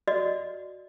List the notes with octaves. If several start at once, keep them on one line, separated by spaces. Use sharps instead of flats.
F#4 D5 D#5